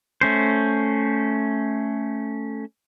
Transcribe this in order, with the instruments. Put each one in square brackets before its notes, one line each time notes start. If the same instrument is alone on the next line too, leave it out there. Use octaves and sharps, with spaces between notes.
[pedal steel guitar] A3 C#4 C5